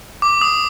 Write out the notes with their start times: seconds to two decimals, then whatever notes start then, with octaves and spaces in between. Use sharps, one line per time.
0.22 D6
0.41 D#6